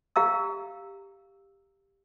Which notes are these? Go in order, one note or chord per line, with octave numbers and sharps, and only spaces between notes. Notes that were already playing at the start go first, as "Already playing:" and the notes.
G4 F5 A#5 E6